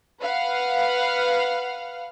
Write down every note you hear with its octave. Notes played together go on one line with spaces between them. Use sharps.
B4 F5 F#5